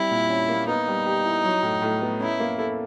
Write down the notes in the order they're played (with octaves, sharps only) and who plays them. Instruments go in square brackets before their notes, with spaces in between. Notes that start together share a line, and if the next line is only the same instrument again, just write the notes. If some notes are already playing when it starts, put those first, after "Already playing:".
Already playing: [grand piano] G3 C4 [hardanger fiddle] E4
[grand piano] A#2
C#4
A#3
[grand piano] B3 [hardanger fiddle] D#4
[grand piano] G3
G4
E4
F#3
A2
A2
B3
[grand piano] C#4 [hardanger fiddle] E4
[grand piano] A#3
A4